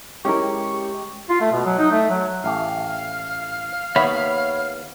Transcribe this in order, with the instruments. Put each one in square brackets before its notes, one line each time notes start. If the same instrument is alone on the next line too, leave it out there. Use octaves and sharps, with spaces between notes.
[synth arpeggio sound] G#3 G4 [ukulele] C#4 E4 A#4 [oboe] C#6
[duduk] F4
A3
B2
F#3
D#4
A3
F#3
[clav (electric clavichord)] A1 A3 G4 [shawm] F5
[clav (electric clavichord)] D#2 B3 [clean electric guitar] C#5 B5 [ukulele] E5